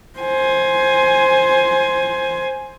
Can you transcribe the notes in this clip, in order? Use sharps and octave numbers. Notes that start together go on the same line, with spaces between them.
C5 G#5